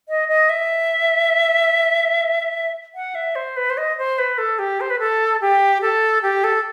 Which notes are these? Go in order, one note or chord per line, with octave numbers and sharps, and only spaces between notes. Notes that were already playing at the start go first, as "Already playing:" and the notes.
D#5
D#5
E5
F#5
E5
C5
B4
C5
D#5
C5
B4
A4
G4
C5
B4
A4
G4
A4
G4
A4